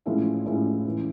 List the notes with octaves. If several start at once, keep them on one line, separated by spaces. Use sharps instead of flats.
A2 F3 G#3 C#4 E4
A2 F3 G#3 C#4 E4
C#3 E3